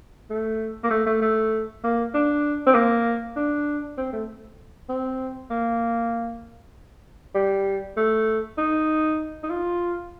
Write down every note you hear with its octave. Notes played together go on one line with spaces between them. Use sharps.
A3
A#3
A3
A3
A3
A#3
D4
C4
A#3
D4
C4
A3
C4
A#3
G3
A3
D#4
D#4
F4